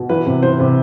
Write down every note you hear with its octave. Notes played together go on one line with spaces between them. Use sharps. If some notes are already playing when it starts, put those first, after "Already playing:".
Already playing: B2
E3 B4
C3
E3 C5
C3